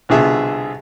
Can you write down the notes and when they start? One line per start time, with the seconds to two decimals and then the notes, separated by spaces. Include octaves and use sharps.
0.09 C2 B2 D3 F4 G#4 E5